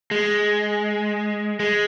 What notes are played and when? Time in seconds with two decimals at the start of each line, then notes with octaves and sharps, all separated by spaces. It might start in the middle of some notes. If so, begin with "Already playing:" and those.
0.11 G#3
1.60 G#3